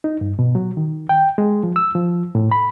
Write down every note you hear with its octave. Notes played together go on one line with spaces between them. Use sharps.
D#4
G2
B2
F#3
D#3
G5
G#3
F3
E6
F3
A2
B5